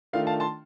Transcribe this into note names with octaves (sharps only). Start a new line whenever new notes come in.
D#3 A3 D4 F4 F5
F5 A5
A5 C6